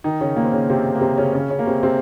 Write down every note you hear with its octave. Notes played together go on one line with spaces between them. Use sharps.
D#3 D#4
C#3 C#4
A#2 A#3
C4
C#3 C#4
C3 C4
A#3
C3 C4
C#3 C#4
C#3 C#4
C#3 C#4
A#3
C3 C4
C3 C4